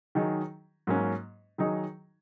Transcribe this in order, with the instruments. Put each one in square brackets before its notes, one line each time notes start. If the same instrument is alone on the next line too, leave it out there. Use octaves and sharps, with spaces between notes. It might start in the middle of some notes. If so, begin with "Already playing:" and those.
[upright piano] D#3 F#3 D#4 G#4
G#2 F#3 A#3 C#4
D#3 F#3 D#4 G#4